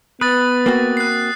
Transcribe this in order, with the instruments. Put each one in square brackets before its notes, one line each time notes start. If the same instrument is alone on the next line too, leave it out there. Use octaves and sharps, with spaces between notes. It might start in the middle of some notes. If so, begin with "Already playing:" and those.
[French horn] B3 [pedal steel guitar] B4 [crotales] D#6 A6
[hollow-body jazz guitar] A#3 C4 F#4
[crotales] F#6 C7